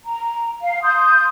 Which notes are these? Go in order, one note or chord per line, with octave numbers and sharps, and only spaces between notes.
A#5
F5
C6 D#6 G6